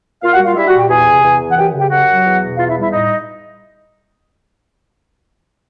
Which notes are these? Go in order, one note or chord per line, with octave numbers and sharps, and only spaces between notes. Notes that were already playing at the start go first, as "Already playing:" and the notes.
A#2 F4 F5
F#4 F#5
G3 F4 F5
G3 E4 E5
F#4 F#5
A#2
G4 G5
E2 G#4 G#5
C3
E2
E3
F#5
F#2 G4 G5
C#3
G4 G5
F#2 F#4 F#5
F#3
E2
B2
E2 F4 F5
E4 E5
G3
E4 E5
A2 D#4 D#5